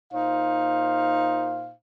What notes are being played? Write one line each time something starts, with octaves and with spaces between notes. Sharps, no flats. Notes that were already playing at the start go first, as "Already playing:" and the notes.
A#2 D#4 C5 F5